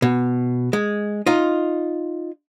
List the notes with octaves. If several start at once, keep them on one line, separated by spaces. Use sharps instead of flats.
B2
G#3
D#4 F4